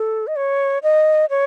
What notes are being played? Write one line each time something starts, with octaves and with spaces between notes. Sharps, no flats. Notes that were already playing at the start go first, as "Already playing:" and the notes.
Already playing: A4
D#5
C#5
D#5
C#5